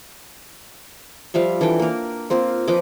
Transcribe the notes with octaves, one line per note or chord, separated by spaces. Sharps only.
F3 G3 E5 F5
E3 D4 A4 G5
A#3 A#4
A#3 C4 F4
F3 B4 D#5 D6